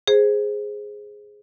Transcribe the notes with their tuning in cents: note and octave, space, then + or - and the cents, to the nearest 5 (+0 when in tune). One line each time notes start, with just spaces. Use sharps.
G#4 +0 C5 +5